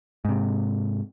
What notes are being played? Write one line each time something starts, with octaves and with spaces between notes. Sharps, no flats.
G#2 C3